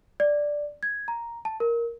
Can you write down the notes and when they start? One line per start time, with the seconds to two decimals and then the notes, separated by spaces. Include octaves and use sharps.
0.20 D5
0.83 G#6
1.08 A#5
1.45 A5
1.60 A#4